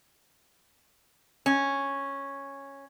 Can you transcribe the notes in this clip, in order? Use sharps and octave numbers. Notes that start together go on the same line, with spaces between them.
C#4